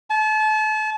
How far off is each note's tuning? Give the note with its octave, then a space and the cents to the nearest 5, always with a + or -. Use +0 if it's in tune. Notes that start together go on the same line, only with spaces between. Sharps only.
A5 -35